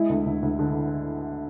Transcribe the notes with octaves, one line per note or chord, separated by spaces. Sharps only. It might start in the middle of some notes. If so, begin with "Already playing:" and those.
Already playing: G#3 E4
D2
D2
D2
D3